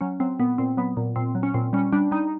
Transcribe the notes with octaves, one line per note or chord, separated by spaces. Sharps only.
F#3 C#4
F#3 C4
A#2 B3
A#2 C4
F#3 B3
A#2
A#2 C4
F#3
C#4
A#2 C4
G3 C#4
G3 D4
G3 D#4